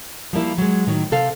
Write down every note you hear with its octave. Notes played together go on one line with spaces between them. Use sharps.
F3 G3 A#3 E4
F#3 G#3
A2 D#3 F#3
C3 A4 F5